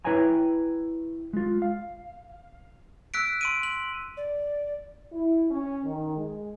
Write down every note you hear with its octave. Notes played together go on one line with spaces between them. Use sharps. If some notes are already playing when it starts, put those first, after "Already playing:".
E4 B4 C#5 G5 G#5 A#5
G#3 F4
F5
E6 F#6 B6 D7
C6 D7 D#7
F#7
D5
E4
C#4
D#3
G#3